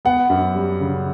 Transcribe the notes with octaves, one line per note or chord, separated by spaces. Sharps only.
B3 F#5
F#2
G3
C#3